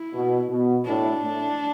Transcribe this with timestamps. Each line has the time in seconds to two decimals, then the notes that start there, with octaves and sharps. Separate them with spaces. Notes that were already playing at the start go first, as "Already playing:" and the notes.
Already playing: E4
0.14 B2
0.50 B2
0.85 A2 D4
1.21 A2